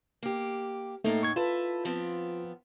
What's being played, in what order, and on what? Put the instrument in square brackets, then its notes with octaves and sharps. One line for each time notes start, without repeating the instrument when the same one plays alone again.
[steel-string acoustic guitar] A#3 G4
[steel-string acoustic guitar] A2 A#3 D#4 [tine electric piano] A3
[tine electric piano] C#6 G#6
[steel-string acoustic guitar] E4 A4 B4 [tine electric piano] F4
[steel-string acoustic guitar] F3 B3 C4